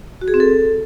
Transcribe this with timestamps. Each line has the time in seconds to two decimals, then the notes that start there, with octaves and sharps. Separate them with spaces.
0.21 F#4
0.28 G#4
0.34 C4
0.40 A4